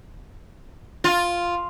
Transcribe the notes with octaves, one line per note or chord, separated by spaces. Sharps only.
F4